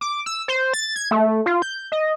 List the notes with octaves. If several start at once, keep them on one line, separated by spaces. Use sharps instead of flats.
D6
E6
C5
A6
G#6
A3
F4
G6
D#5